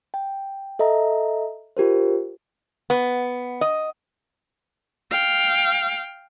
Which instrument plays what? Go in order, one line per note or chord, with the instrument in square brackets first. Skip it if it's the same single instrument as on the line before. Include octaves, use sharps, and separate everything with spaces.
[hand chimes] G5
A4 D#5 E5 A#5
F4 G4 A#4 C5
[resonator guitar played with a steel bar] B3
D#5
[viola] F5 G5